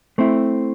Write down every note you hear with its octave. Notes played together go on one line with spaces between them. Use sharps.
A3 C4 E4